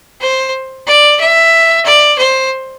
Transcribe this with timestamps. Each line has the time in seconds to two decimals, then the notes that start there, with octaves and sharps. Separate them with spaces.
0.21 C5
0.87 D5
1.20 E5
1.85 D5
2.18 C5